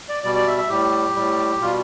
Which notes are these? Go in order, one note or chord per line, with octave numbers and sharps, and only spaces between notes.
D5
B2 G3 D5
D5
E5
E5
A2 G3 G4
A2 G3
B2 G3 F4